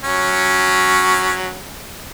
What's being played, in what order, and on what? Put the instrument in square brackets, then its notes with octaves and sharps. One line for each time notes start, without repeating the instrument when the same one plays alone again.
[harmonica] F#3 C#4